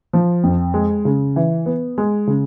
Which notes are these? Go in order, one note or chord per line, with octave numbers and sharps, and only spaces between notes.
F3
F2
G#3
C#3
E3
B3
G#3
C#3